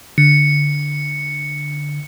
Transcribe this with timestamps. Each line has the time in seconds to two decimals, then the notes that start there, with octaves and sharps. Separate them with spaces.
0.18 D3 C#7